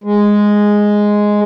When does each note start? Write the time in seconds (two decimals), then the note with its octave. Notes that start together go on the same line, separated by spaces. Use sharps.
0.04 G#3